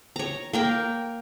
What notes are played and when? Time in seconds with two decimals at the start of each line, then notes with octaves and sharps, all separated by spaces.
0.16 C#5 A#5
0.53 A#3 A#4 G5